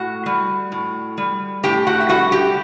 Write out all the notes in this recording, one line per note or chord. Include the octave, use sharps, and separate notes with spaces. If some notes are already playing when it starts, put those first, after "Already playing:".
Already playing: A2 F#4 F#5
G3
A2
G3
A2 G4 G5
F#4 F#5
E5
G3 F#4 F#5
G4 G5